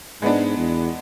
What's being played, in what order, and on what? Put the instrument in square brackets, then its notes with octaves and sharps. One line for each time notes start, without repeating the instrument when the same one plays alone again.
[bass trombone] G#2 [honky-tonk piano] G#3 B3 D4
[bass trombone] E2